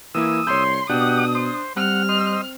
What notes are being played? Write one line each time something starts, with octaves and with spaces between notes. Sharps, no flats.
E3 A#3 E4 D#6 E6
C2 C#5 C6 G6
B2 D4 G4 F#5 D#6
C5
G3 C4 F#5 F6
C5 D#5